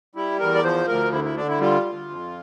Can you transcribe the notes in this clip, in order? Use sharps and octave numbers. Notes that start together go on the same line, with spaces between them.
G3 E4
E2 A#4
D5
F3 C5
D2 A#4
D3 E4
E4
D3 D4
E4
G3 F4
D2
F2